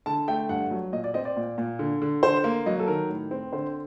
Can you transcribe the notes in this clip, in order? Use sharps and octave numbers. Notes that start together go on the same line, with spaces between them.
D3 A5
A3 G5
G2 F#5
F#3
A#2 D#5
D5
C4 D#5
D5
A#2
A#2
D3
D3
D3 C5
A#3
F#3 D#5
A4
D#3 A#4
A2
C4
D3 C5